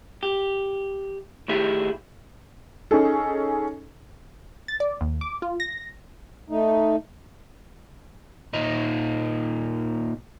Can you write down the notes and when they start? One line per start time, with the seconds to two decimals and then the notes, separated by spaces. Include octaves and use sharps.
0.23 G4
1.48 A2 D#3 E4 G4 G#4
2.91 C#4 D#4 G#4 A4
4.68 A6
4.80 D5
5.01 D#2
5.21 D6
5.42 F4
5.60 A#6
6.50 A3 D#4
8.53 A#2 D#4